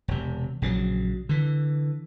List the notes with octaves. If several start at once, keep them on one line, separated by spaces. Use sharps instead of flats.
E1 C3
A#1 C#3 E3 F#3
D3 E3